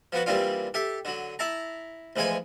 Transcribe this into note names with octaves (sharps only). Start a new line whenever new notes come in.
F3 B3 F#4
E3 G3 A#3 C4 D4 F4
G4 A4 E5
D3 F#3
E4 E5 A5 A#5
D2 E3 F3 G#3 G#4 G#5